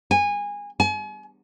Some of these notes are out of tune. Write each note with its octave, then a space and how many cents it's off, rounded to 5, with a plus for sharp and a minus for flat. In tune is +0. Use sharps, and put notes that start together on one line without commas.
G#5 -20
G#5 +40